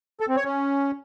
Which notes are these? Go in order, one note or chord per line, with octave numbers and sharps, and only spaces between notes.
A4
C4
C#5
C#4